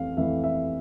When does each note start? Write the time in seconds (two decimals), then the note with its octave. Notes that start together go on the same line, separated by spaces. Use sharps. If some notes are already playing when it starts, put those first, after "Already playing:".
Already playing: F2 E3 A3 F5
0.17 F2 E3 A3 E5
0.44 E5